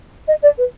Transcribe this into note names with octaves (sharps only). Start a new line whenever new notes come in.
D#5
D5
B4